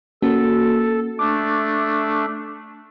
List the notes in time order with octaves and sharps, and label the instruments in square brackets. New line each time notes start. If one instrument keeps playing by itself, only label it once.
[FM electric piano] A#3 C#4 F#4 [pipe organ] A4
[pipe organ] A3 D4 [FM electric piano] D6